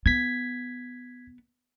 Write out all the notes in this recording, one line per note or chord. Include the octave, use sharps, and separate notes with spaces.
B3 G#6 B6